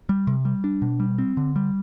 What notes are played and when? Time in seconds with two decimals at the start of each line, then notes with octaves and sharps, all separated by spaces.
0.09 G3
0.27 C3
0.45 G3
0.64 D4
0.82 B2
1.00 G3
1.18 C4
1.37 D3
1.56 G3